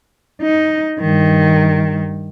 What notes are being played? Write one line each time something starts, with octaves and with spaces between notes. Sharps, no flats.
D#4
G2 D#3